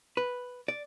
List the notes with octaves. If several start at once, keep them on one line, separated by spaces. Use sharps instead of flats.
B4
D5